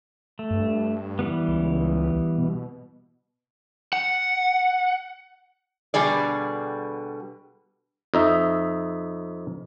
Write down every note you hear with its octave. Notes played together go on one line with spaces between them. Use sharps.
A3
G2
E3 G3 B3
C#2
B2
F#5
B2 D3 G3 G#4 D5
F2 D#4 E5